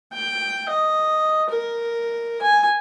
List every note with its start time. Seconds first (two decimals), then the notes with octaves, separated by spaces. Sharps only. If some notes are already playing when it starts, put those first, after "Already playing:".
0.13 G5
0.69 D#5
1.50 A#4
2.42 G#5